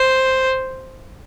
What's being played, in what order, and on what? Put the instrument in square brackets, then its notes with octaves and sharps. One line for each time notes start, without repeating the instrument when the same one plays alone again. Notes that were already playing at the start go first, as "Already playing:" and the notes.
Already playing: [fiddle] C5